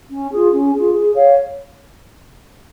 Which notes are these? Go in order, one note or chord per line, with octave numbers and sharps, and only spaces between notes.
C#4
F4 G#4
C#4
F4 G#4
G#4
C#5 F5